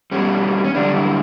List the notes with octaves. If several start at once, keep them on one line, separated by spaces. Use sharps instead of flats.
B2 G3 C#4
C#4
F#2 D3 G3 D4
E4